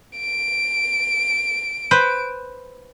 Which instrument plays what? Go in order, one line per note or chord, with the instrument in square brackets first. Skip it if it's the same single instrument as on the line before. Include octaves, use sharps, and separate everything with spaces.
[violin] D7
[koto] B4 C5